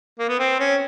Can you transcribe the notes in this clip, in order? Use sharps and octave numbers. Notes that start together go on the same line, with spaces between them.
A#3
B3
C4
C#4